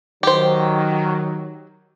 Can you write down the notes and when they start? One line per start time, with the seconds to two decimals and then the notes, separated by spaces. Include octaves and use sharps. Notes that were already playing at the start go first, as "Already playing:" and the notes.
0.23 D#3 F#3 G4 C5